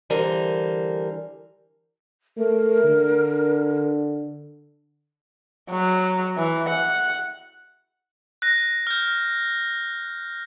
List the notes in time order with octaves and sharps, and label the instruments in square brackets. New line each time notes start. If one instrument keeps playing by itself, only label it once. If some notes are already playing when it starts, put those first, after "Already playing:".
[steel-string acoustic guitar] D3 E3 G3 A#4 C5
[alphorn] A3 [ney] A#4
[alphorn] D3
[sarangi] F#3
E3
F#5
[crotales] F#6 A#6
F6 G6